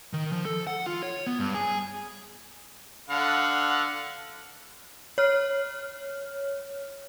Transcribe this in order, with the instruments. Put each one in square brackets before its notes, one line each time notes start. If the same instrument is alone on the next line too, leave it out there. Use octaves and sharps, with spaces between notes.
[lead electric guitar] D#3
F3
A4
F#5
F4
C#5
B3
G2
G#4
[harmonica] D3 F5 F#5
[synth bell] C#5 F6